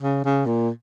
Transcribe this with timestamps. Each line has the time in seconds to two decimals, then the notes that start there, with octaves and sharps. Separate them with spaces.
0.02 C#3
0.25 C#3
0.46 A#2